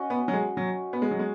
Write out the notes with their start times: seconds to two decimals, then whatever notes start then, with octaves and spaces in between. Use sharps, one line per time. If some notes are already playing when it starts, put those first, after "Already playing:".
Already playing: C#4 F#4 D#5
0.10 B3
0.28 F#3
0.34 G#3
0.57 F#3
0.93 B3
1.02 G#3
1.11 F#3
1.19 G#3